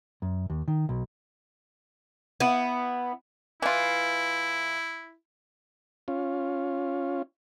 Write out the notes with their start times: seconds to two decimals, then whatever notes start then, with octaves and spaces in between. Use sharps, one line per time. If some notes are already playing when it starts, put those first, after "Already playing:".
0.22 F#2
0.50 D#2
0.68 D#3
0.89 B1
2.40 B3 E4
3.62 E3 E4 F4
6.08 C#4 F4